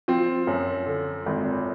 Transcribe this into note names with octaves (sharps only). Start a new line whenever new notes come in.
F3 C4
F#2
D3
G#1